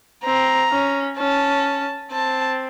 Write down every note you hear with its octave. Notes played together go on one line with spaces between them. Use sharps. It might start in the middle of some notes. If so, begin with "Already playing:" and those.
C4 A#5
C#4
C#4 A5
C4 A5